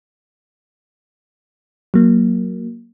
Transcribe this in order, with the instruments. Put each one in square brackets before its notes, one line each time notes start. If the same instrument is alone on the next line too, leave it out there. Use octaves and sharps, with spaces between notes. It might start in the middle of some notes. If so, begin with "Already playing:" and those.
[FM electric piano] F#3 A#3